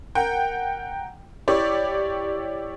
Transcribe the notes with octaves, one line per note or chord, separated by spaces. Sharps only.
A#4 F#5 G5
E4 G4 C#5 D5